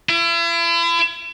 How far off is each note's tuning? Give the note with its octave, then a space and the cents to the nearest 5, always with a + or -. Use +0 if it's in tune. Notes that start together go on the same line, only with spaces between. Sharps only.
E4 +40